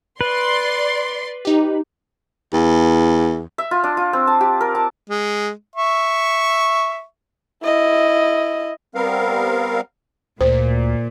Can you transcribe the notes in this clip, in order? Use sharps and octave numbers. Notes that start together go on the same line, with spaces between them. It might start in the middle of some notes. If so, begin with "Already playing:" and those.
B4 D5 C6
D#4 G4
E2
E5
F4
D4
F4
C4
A5
G4
A#4
A5
G#3
E5 C#6
E4 D#5
G3 B3 C4 A#4 F5
D2 A#2 C5